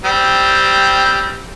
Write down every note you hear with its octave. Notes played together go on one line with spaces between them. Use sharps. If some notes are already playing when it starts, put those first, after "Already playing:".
G3 C4